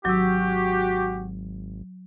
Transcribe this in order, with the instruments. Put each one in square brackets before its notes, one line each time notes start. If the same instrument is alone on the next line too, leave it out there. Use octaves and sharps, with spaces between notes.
[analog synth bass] G#1 [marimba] F#3 E6 [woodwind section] F#4 G4